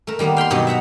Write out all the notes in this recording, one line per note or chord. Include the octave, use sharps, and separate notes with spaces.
A3 A#4
D#3 G3 A#3 B3 G4
F5 G5 B5 C6
G2 B2 F#3 D#4 G4
E5 F#5 A#5 B5